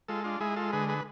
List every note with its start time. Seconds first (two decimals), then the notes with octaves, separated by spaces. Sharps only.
0.08 G#3 F4 A4
0.24 D4 F4
0.40 G#3 E4 G#4
0.56 F4 A4
0.73 D3 G#4 B4
0.89 G#4 B4